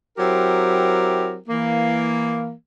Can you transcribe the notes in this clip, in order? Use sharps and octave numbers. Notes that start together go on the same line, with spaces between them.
F#3 C4 E4 G4 A#4
E3 A#3